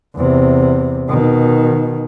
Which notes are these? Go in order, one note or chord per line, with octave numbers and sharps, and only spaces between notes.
E2 C3
B2 D#3